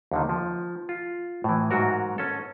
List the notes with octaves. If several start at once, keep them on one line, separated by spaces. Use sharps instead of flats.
D#2 D3 D#3
F3
F4
A2 E3
G#2 F#3 F#4 A#4
C#4 A4